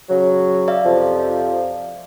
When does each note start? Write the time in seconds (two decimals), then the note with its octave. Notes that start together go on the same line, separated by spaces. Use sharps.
0.09 C#3 F#3
0.68 D5 E5 F5
0.85 F2 C3 F3